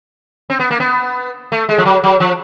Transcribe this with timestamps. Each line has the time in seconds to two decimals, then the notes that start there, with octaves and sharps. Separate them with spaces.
0.50 C4
0.59 B3
0.71 A#3
0.80 B3
1.52 A3
1.69 G#3
1.78 F3
1.85 F#3
2.04 F#3
2.20 F3